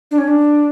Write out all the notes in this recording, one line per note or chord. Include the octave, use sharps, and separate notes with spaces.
D4
C#4
D4